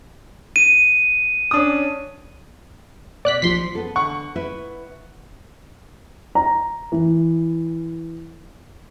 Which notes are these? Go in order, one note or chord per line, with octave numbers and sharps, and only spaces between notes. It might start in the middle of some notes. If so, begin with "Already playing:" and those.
D#7
C#4 D4 D#6
B2 D5 F#6 B6
A#1 F3 C6 B6
B3 A4
D3 F#5 C#6
E4 B4 E5
A#5
E3